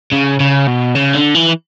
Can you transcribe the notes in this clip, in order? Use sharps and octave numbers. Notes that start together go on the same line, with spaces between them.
C#3
C#3
B2
C#3
D3
E3